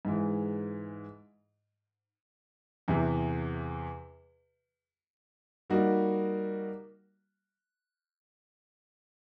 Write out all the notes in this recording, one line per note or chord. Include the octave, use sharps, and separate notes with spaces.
G#2 E3 G#3
E2 C3 E3
G3 A#3 D#4 F#4